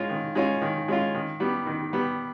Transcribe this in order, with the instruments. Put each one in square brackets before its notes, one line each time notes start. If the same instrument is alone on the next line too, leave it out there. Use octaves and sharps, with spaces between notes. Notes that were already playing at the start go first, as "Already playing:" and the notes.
Already playing: [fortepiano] G#3 C#4 F4
D#3
G#3 C#4 F4
D#3
G#3 C#4 F4
D#3
G3 B3
D#3
G3 B3